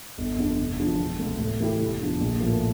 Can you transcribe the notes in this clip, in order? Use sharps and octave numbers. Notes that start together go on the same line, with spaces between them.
G1
F2 D3
F1
E2 D3 F3
E1
D2 C3
A2
E3 A3 E4 G4
F1
E2 D3 F3
A#1
A2 F3 A#3